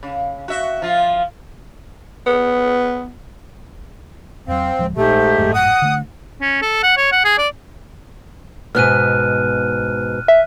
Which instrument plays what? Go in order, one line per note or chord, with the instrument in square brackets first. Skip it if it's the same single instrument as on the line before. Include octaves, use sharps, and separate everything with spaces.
[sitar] C#3
F#4 E5
F3 F4
[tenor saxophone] B3
[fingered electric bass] E2 F#3 [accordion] C4 [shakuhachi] F5
[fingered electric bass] D1 F3 G#3
[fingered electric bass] A#1 [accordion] G#2 A3 [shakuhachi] G4
[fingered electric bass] G#1 F#2 A2
[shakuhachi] F#5 [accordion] D#6
[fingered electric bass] D3 A3
[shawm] C#4
A4
F#5
C#5
F#5
G#4
D5
[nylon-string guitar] G#2 B2 B3 [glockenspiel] F6 F#6 D#7
[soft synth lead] E5